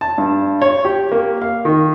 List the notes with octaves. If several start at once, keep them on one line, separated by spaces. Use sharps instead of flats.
A5
G2
C#5
G4
A#3
F5
D#3